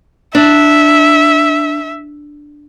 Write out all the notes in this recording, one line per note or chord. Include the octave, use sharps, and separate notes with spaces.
D4 E5